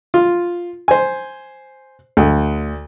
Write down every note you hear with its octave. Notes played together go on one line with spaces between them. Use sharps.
F4
C5 G#5
D2